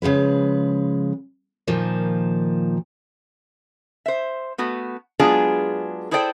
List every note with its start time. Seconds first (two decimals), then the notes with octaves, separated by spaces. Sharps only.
0.02 C#3 F3 G#3 B4
1.67 A#2 D#3 F3 A#3
4.06 C5 E5
4.58 A3 B3 F#4
5.20 F#3 G#3 B3 D4 F4 G#4
6.11 E4 G#4 A4 C5 D5 G5